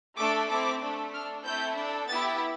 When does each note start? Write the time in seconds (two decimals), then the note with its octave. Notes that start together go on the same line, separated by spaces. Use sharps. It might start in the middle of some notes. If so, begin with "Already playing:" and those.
0.18 A3 D4 A4 D6
0.49 C4 E4 A4 D6
0.81 A3 D4 A4
1.13 D4 A4 F6
1.45 A3 C4 E4 A4 G6
1.77 D4 A4
2.09 B3 E4 G4 A6